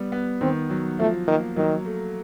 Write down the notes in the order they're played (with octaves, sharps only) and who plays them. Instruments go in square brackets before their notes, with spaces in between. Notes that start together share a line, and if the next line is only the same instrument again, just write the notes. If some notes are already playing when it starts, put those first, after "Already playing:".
Already playing: [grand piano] G3 B3
B3
[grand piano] D#3 [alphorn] C4
[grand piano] F#3
[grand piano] F3 [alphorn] A3
[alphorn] D#3 [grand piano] A#3
[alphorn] D#3 [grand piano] F#3
[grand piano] A3